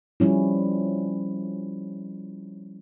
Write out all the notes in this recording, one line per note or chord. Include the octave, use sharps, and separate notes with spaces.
F3 G3 C#4 E4